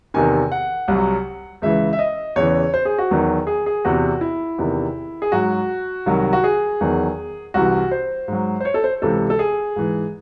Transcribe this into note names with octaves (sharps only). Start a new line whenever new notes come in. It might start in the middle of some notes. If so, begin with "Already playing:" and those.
E2 C3 D#3 G#5
F#5
C2 C3 F#3
C#2 C#3 E3 E5
E5
D#5
E2 C#3 E3 C#5
C5
G#4
F#4
E2 D#3 F#3
G#4
G#4
E2 C3 E3 F#4
E4
E2 C3 D#3
G#4
G#2 F#3 F#4
C2 C3 D#3 F#3
F#4
G#4
E2 D#3 F#3
C2 C3 E3 F#4
C5
G#2 F#3
C5
C#5
A4
C5
C#2 C3 E3 A4
A4
G#4
G#2 E3